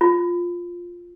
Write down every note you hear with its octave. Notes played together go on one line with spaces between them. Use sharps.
F4